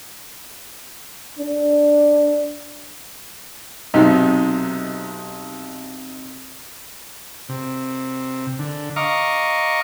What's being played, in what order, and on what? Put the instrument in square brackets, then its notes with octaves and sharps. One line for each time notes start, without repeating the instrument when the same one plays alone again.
[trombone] D4
[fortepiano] B1 C3 D#4
[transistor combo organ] C3
D3
D#5 F5 A#5 C#6 D6